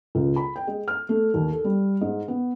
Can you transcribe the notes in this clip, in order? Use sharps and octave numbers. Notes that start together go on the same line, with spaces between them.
C#2
B5
G5
G#3
F6
A3
D#2
A4
G3
G#2
B3